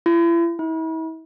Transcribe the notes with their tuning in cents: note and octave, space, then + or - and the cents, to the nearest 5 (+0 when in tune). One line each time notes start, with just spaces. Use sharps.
E4 +40
E4 -40